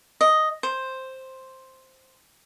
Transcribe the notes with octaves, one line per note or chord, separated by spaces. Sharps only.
D#5
C5